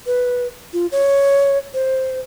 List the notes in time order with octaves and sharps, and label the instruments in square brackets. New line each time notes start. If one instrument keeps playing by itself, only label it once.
[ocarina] B4
F4
C#5
C5